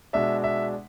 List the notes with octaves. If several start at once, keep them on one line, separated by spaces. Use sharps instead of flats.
B2 G#3 D4 E5
E5